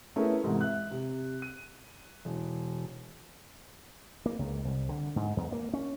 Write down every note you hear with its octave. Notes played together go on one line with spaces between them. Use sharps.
A3 B3 C#4 E4 G#4 A#4
E2 G#2 C3
E5 F#6
C3
D#7
E1
A#3
C#2
C2
D3
G#2
E2
A#3
C#4